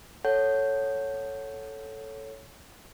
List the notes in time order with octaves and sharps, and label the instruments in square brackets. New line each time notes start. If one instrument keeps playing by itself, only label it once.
[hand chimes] A4 C#5 F#5 G6